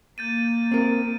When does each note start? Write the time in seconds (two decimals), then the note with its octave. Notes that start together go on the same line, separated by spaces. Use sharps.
0.18 A#3 G6 A6 D#7
0.72 C4 A#4